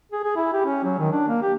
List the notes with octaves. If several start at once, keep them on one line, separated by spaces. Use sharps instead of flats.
G#4
G#4
E4
G4
C#4
F#3
D#3
D4
A#3
G4